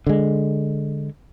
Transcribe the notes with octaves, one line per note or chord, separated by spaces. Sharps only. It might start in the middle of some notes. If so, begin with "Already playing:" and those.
D3 G#3